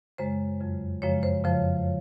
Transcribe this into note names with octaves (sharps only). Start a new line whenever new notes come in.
F#2 C#3 G#3 C5
F2 C#3 F#3
F#2 C#3 F3 G#3 C#5
C5
F2 C#3 F3 C5